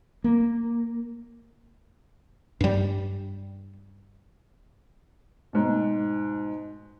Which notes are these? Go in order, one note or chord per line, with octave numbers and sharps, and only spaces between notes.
A#3
G2 G3
G#2 B2